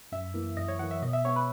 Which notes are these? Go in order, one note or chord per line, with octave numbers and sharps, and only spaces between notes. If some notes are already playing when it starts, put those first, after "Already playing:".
F#2 E5
E3 A#3
F#2 D#5
C#5
E3 A#3 F#5
E5
B2 D#5
E5
G#3 B3 C#5
B4